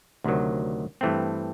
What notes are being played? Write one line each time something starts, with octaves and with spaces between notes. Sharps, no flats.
D2 C3 D#3 F#3
G2 E3 A3 C4